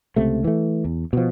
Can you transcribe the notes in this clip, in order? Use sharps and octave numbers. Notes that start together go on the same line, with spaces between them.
C#2 C3 A3
E3 A3
E2
B2 F3